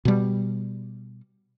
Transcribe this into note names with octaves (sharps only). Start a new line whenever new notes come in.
B2 G3